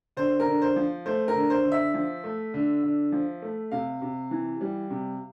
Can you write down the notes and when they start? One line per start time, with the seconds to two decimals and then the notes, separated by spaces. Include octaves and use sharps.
0.17 D3 C5
0.40 A#4
0.47 D3
0.62 C5
0.76 F3
1.06 A3 C5
1.28 A#4
1.35 D3
1.50 C5
1.65 D3
1.72 E5
1.94 F3
2.24 A3
2.54 D3
2.83 D3
3.12 F3
3.42 A3
3.71 C3 F5
4.02 C3
4.31 E3
4.61 G3
4.90 C3